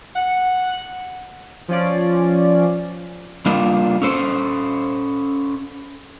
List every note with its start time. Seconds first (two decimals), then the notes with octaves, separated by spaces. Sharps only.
0.16 F#5
1.68 F3 C#4 F4 D5
3.46 G3 A#3 D4 F4
4.02 C#4 A4 C5